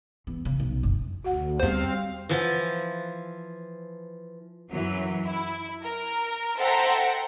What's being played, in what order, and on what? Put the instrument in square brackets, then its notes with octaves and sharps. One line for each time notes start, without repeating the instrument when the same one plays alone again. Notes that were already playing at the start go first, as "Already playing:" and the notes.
[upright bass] E2
C#3
B1
F#1
[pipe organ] D2 [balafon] F#4 F#5
[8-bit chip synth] E2 C5 [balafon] G3 G4 [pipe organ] C4 F5
[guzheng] E3 F3
[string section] F#2 E3 F#3
E4
A#4
A4 C5 E5 F#5 G5 A#5